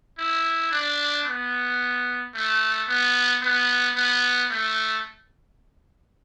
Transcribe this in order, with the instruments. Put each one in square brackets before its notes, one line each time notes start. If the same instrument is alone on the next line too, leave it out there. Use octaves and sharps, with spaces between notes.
[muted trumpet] E4
D4
B3
A3
B3
B3
B3
A3